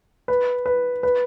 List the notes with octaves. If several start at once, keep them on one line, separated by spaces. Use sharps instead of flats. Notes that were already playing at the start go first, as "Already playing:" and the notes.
B4
B4
B4